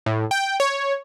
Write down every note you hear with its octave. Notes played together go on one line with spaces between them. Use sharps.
A2
G5
C#5